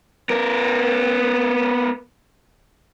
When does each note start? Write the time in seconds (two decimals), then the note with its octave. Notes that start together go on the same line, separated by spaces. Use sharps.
0.30 B3 A#4